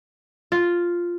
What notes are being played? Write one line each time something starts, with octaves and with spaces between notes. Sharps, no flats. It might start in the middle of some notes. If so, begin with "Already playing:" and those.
F4